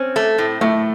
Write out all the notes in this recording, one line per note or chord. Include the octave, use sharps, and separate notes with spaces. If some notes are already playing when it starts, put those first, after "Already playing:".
Already playing: C4 C#4
A3
A2
A2 A3